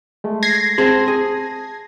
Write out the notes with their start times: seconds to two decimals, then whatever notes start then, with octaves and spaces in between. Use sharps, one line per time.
0.24 G#3 A3
0.43 G#6 A#6 C7
0.78 C4 G#4 C5 A5
1.08 G#4